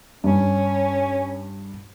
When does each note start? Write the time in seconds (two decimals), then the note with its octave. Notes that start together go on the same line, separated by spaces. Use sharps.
0.24 G2 C#4